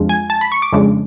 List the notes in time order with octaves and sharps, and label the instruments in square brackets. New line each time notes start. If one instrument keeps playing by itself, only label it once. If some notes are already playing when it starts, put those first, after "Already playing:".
Already playing: [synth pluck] F2 F3 G#3 D4 F4
G#5
A5
B5
C#6
D6
F2 C#3 G#3 D4